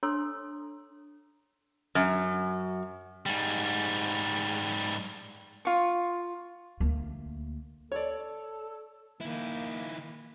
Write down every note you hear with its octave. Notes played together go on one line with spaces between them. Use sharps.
D4 A4 C#5 A#5 C6 E6
F#2
G#2 G3
F4 C#6
D2 A#3
A4 C#5 D5
D#3 A#3 E4